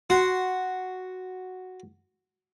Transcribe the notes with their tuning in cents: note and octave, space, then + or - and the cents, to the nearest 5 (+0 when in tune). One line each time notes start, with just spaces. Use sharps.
F#4 +0 C6 +0